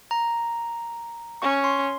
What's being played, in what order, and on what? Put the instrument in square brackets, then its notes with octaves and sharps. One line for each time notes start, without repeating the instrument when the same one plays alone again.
[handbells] A#5
[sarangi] C#4 [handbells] C#6
[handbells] C6